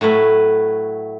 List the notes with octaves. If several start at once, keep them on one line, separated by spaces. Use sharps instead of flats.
A2 F#3 A3 B4